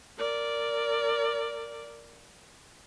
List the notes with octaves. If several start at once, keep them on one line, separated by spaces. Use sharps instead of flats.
A#4 D5